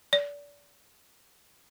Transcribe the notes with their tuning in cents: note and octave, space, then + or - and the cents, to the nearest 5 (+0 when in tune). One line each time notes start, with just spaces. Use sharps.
D5 -30